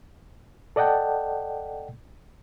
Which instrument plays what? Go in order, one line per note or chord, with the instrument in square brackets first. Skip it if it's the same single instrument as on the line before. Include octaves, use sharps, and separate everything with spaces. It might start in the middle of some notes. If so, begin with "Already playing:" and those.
[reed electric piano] A4 D5 D#5 F#5 G5 A5